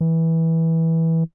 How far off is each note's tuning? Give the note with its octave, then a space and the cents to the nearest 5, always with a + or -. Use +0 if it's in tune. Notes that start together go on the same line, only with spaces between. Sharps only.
E3 -15